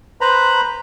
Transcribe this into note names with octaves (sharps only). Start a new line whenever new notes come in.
B4 C5 A#5 B5